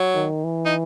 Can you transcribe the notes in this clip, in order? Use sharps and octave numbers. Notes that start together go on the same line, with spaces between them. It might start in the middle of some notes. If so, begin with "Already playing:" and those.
Already playing: F#3
D#3
E3
D#4